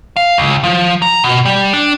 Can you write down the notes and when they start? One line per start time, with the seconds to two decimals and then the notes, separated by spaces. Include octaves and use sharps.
0.16 F5
0.38 C#2
0.64 F3
1.02 A#5
1.24 B2
1.45 G3
1.73 D4